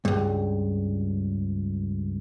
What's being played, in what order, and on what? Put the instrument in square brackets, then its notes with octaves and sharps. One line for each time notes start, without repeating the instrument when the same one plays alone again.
[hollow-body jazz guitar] C#2 G2